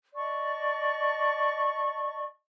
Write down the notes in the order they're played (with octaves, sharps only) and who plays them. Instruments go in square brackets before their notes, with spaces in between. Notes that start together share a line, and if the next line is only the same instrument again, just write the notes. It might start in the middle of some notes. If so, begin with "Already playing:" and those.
[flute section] D5 D#5 A5 C#6